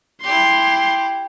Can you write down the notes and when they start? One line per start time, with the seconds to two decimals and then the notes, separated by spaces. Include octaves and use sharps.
0.23 E4 G4 C6